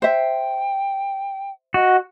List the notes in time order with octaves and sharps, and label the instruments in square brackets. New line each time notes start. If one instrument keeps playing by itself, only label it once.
[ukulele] C5 E5 [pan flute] G5
[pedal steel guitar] F#4 [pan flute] D#5